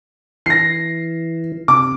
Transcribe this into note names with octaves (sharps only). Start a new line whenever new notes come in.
E3 A#6 C7
C3 D6